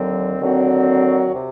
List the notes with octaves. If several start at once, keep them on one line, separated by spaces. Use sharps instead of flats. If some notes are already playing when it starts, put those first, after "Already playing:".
Already playing: D#2 D3 F#3 C4
D#2 D3 F#3 C4
C3